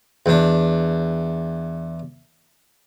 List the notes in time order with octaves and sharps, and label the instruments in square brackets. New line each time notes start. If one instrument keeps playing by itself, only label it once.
[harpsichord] E2 D4